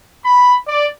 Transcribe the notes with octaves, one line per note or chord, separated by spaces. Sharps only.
B5
D5